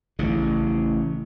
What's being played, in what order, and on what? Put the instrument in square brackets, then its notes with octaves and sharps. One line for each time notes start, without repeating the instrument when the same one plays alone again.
[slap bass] A1 C#3